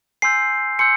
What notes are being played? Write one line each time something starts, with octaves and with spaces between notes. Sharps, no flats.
G#5 C6 E6 G6 C7
G#5 C6 E6 G6 C#7